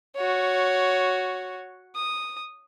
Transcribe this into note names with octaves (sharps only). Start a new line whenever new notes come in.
F#4 C#5
D#6